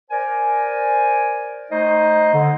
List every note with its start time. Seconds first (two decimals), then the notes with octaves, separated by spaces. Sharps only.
0.10 A#4 C5 D5 G#5
1.71 A3 D#4 C5 D#5
2.33 D3